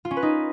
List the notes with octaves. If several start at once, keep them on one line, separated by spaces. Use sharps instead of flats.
F4
C#4
B4
D#4